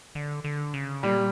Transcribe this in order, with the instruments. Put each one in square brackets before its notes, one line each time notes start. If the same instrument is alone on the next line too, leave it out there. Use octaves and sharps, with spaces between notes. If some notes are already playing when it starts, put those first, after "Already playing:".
[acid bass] D3
D3
C#3
[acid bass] A#2 [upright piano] G3